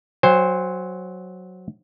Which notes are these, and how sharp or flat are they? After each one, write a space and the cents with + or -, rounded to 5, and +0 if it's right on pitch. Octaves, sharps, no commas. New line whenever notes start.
F#3 +0 C5 +0 G#5 -45